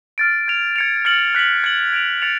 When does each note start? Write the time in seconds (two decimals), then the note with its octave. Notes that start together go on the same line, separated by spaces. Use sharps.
0.18 F6 A6 D7
0.48 G#6 D7 F7
0.76 G#6 C#7 F7
1.05 F6 A6 C#7 F#7
1.35 F#6 B6 F#7
1.64 G#6 C#7 F#7
1.93 G#6 D7 F7
2.22 F6 A6 C#7 F7